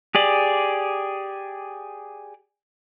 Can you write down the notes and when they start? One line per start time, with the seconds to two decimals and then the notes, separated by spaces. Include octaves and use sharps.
0.15 G4 G#4 D5